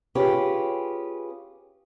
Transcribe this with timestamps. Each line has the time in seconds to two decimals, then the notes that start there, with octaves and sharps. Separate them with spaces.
0.15 C#4 F4 G4 G#4 B4